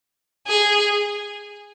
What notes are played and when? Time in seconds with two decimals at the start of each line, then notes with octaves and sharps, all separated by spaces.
0.48 G#4